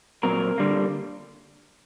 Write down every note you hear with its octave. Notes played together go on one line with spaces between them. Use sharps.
A#2 F#3 C4 A#4
D3 G3 A#3